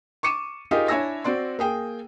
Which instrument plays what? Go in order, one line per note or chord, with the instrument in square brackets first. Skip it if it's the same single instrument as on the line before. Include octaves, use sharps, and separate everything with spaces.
[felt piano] C#6 D6 C#7 D#7 E7
D#4 F4 G4 G#4 A#4
D4 E4 C#5 G#5 E6 A#6
C4 F#4 D5 C6
A#3 G#4 G5